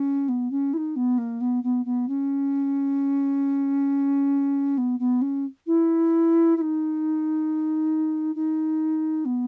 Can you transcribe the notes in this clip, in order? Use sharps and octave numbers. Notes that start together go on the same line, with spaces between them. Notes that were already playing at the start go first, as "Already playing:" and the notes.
Already playing: C#4
B3
C#4
E4
D#4
B3
A#3
B3
B3
B3
C#4
B3
B3
C#4
E4
E4
D#4
D#4
B3